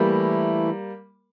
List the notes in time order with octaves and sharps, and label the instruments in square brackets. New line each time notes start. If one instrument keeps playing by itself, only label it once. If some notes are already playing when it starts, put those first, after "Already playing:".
Already playing: [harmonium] E3 A3 E4 [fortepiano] G3 A#3